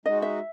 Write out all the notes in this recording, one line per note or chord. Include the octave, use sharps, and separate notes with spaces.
G#3 D#4 F#4 D#5
E5